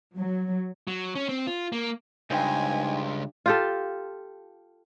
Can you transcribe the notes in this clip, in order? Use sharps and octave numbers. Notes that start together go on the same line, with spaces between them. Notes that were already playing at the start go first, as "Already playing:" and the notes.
F#3
F#3
C#4
C4
F4
A#3
C#2 G2 D#4 C5 G5 G#5
F4 G4 A4